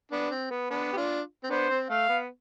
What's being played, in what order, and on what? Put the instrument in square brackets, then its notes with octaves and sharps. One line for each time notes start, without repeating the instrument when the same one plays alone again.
[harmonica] B3 D4
C4
B3
B3 D4
G4
D4 F4
C4
[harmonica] B3 D4 [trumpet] C5
[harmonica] C4
[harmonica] A3 [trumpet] F5
[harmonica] B3